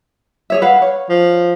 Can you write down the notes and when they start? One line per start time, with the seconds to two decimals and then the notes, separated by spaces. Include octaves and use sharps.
0.50 G#4 C#5 E5
0.62 B4 F5 F#5
0.82 C#5
1.09 F3